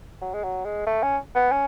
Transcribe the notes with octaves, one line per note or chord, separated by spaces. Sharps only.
F#3
G#3
F#3
G#3
A3
C#4
B3
C#4